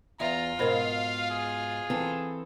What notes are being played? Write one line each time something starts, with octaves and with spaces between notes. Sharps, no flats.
E2 F4 E5 A#5
G#2 B2 A#4 C5 F5 B5
G#4
E3 C4 A4